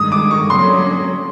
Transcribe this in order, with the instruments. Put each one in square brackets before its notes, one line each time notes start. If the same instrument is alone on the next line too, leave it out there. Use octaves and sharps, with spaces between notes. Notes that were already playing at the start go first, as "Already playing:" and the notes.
Already playing: [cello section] G2 D#3 G#3 [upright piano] D#6
[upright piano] D6
C#6
[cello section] G2 D3 F#3 A#3 C#4 [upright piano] C6